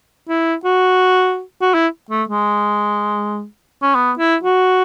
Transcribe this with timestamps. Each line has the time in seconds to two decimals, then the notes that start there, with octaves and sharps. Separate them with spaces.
0.29 E4
0.65 F#4
1.61 F#4
1.74 E4
2.11 A3
2.29 G#3
3.82 C#4
3.95 B3
4.19 E4
4.43 F#4